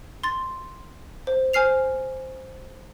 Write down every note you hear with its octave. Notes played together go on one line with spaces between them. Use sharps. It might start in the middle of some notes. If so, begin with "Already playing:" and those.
C6 A6
C5
C5 G#5 F6 C7 F7